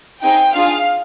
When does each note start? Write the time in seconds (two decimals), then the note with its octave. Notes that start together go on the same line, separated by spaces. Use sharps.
0.23 C4 D#4 G#4 G5
0.55 D4 F4 G#4 F5